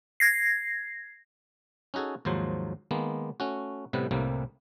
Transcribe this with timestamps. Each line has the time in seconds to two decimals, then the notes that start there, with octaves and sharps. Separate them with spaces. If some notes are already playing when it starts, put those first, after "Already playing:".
0.20 G#6 A#6 C7
1.94 C#4 D#4 F#4 G#4 A4
2.25 D#2 G#2 F3 F#3 C5
2.91 D#3 G#3 A#3 B3
3.40 A3 C#4 F#4
3.93 A2 C3 G3 B3 B4
4.11 C2 A2 C3 G3 A#3